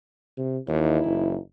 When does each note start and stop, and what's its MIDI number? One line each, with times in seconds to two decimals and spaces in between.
0.38 0.58 48
0.68 0.99 39
0.68 1.39 52
0.68 1.39 63
0.68 1.39 64
1.05 1.36 30